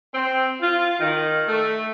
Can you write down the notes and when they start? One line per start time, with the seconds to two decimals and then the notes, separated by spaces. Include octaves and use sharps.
0.14 C4
0.61 F4
1.00 D#3
1.48 A3